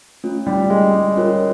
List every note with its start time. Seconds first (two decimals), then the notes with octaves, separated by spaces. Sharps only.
0.24 A3 C#4 F4
0.47 G3
0.70 G#3
0.93 G3
1.16 C#4 F4 A#4 C#5